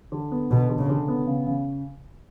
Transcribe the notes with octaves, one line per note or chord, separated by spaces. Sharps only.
D3
B3
B2 D3
D3
C#3
D3
B3
C#3
C#3